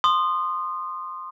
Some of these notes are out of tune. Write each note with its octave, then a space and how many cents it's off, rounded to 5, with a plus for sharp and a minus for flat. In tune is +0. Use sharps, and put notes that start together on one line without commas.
C6 +0 D#6 -25